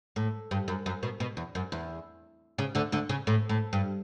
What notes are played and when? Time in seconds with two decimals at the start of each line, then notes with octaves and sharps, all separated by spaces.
0.16 A2
0.51 G2
0.68 F#2
0.86 F#2
1.03 B2
1.20 B2
1.37 E2
1.55 F#2
1.72 E2
2.58 C#3
2.75 D2 D3
2.92 D2 D3
3.09 C#3
3.27 A2
3.49 A2
3.73 G2